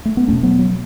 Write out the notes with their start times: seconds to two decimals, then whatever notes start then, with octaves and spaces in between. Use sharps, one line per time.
0.05 A3
0.17 B3
0.28 E2 B2 A3 C#4
0.43 F#3 B3
0.59 F#3